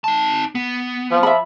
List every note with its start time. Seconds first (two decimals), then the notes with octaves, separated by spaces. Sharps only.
0.04 D#4 A5
0.55 B3
1.11 F3
1.23 E5 B5